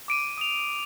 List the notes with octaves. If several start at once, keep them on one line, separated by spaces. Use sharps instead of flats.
D6 D7 D#7
D#6 F7